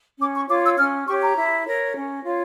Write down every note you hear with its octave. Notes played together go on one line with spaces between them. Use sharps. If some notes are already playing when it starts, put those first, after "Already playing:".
C#4 D6
C#6
F4 C#5 D6
E6
C#4 F6
G4 C#5 C#6
A#5
E4
A#4 C#5
C#4
F4 C#5